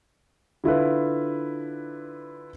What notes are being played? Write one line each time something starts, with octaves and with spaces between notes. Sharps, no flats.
D3 E4 F4 B4